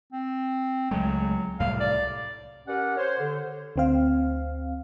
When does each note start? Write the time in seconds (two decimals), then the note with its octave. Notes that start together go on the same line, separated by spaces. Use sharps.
0.13 C4
0.91 C#2 F#3 G#3 A3
1.60 C2 A2 G3 F5
1.80 D5
2.67 C#4 G4 A#4 B4 D5 F#5
2.97 C5 C#5
3.19 D3
3.76 D2 C4 F5